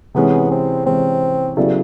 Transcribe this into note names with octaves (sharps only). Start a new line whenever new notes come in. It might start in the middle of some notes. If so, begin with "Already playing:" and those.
C3 E3 G#3 B3 C#4
C4
C3 E3 G#3 C4 C#4
C#3 F#3 G3 B3 E4 A4